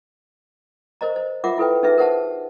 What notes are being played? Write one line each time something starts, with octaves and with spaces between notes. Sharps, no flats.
A#4 C5 D#5 A#5
C5
F4 A#4 E5 F#5 D6
E4 A4 B4 G5
C#4 D#4 G#4 B4 E5
A#4 C5 F#5 A5